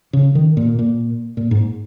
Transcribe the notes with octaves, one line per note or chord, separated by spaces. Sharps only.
C#3
D#3
A#2
A#2
A#2
G#2